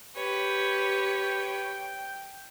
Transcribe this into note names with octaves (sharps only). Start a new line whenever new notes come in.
G4 B4 C#5 G5